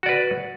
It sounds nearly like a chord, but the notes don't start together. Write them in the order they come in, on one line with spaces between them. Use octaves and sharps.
F#4 D5 B4